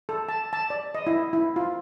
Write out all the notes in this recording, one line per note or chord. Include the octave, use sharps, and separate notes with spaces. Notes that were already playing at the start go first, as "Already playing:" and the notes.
A4
A5
A5
D5
D#5
E4
E4
F4